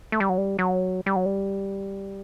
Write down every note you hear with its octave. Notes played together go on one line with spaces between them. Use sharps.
A3
G3
F#3
G3
F#3
G3
F#3
G3